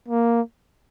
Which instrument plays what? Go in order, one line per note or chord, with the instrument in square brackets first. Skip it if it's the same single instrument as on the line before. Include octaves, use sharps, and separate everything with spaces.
[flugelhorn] A#3